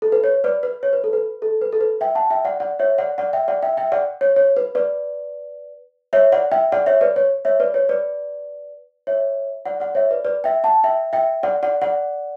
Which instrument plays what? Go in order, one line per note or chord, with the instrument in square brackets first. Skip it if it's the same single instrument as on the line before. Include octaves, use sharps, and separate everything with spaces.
[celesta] A4
B4
C#5
B4 D5
B4
C#5
B4
A4
B4
A4
B4
A4
B4
E5 G5
F#5 A5
E5 G5
D5 F#5
D5 F#5
C#5 E5
D5 F#5
D5 F#5
E5 G5
D5 F#5
E5 G5
E5 G5
D5 F#5
C#5
C#5
B4
B4 D5
C#5 E5
D5 F#5
E5 G5
D5 F#5
C#5 E5
B4 D5
C#5
C#5 E5
B4 D5
C#5
B4 D5
C#5 E5
D5 F#5
D5 F#5
C#5 E5
B4 D5
B4 D5
E5 G5
F#5 A5
E5 G5
E5 G5
D5 F#5
D5 F#5
D5 F#5